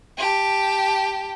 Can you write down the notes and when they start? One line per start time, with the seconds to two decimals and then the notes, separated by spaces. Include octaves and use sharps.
0.18 G4 A5